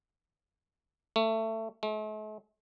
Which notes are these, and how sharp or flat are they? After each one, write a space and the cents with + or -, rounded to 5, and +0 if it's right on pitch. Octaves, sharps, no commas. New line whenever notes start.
A3 +20
A3 -45